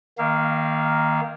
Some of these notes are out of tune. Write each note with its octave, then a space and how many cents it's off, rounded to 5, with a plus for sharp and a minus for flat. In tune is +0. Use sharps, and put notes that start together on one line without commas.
D#3 +0 A#3 +0 F5 -35